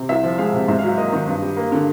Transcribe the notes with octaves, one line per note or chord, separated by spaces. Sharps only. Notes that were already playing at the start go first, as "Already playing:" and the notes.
Already playing: C3
C2 E5
F3
G#3 F5
C3
G#2 E5
F5
F#3
E5
A#3 D#5
D#3
G2
G3
A#3
D3